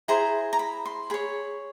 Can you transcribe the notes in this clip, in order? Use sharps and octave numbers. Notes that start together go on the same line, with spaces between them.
E4 G#4 C5 A#5
A#5
B5
C6
G#4 C#5 B5